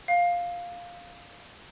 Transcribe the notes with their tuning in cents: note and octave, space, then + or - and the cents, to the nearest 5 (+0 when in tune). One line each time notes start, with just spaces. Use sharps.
F5 +5